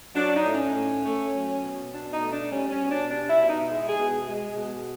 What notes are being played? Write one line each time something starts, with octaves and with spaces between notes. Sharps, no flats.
F#3 D4
D#4
A2
C#4
A2
A3
F#3
B2
B2 D4
D#4
A3
D4
G3 C#4
C#4
B2
D4
G3 D4
E4
B2
D#4
G#3 E4
G#4
B2
G#3
B2